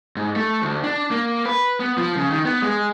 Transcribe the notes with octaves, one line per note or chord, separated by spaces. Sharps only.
G#2
A3
D2
D4
A#3
B4
B3
F3
C#3
D#3
B3
G#3